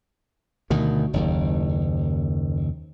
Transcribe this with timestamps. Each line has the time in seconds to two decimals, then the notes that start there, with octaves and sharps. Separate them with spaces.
0.70 D2 B2 D#3
1.13 F#1 D#2